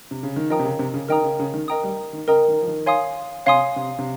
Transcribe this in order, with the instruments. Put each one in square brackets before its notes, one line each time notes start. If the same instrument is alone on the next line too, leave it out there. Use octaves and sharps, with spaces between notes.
[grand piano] C3
C#3
D#3
[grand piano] F3 [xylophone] A#4 D#5 G5 A#5 D#6
[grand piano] C3
C#3
C3
C#3
[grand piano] D#3 [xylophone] A#4 D#5 G5 A#5 D#6
[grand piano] C#3
C#3
D#3
[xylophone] A#4 D#5 G5 A#5 D#6
[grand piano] G3
D#3
[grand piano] C#3 [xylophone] A#4 D#5 G5 A#5 D#6
[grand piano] D#3
F3
D#3
[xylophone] C#5 F5 G#5 C6 D#6
[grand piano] C3 [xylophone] C#5 F5 G#5 C6 D#6
[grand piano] C3
C3